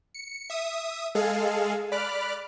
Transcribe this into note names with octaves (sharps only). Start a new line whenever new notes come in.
C#7
E5 D#6
G#3 G#4 A4 F5
D5 B5 D6 F6 F#6